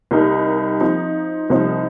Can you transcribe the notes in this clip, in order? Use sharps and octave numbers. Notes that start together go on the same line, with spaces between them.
C2 C3 G3 D#4 A#4
F3 C4 D#4
C2 C3 F3 D#4 C5